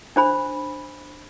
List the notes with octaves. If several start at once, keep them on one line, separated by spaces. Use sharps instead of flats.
D4 C5 B5